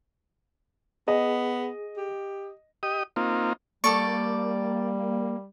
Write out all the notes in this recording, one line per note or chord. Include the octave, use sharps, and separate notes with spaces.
B3 G#4 D#5
G4
G4 D#5 D#6
A#3 C4 D#4 F4
G3 A#3 G4 A4 D5 C#6